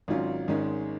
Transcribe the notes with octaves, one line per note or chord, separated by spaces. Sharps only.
G#1 G#2 F#3 C#4 F4
G#1 G#2 D#3 G#3 C#4